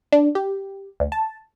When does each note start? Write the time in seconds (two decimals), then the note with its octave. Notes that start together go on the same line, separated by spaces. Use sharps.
0.12 D4
0.35 G4
1.00 D2
1.12 A5